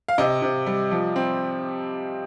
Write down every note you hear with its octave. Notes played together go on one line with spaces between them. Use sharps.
F5
C3 D#5
C3
G3
F3
C4